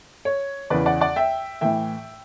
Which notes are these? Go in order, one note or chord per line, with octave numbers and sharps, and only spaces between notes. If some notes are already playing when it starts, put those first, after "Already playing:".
C#5
E2 C#3 E3 B4 D5
D5 F#5
D5 F#5
E5 G5
A2 E3 E5 G5